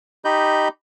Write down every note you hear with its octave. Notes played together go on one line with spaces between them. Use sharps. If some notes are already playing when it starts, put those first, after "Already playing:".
D#4 G4 D#5 B5 G6